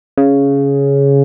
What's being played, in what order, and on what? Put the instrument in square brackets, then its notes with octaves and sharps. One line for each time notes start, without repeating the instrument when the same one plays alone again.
[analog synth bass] C#3